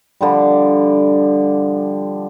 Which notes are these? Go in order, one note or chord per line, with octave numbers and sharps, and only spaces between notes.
D3 F3 G3